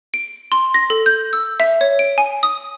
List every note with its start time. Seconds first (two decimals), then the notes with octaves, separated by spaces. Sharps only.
0.14 D7
0.52 C6
0.74 A#6
0.90 A4
1.06 G6
1.33 E6
1.60 E5
1.81 C#5
1.99 D7
2.18 G#5
2.43 D#6